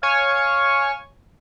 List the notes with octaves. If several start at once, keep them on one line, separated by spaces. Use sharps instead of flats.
C#5 F5 G#5 C#6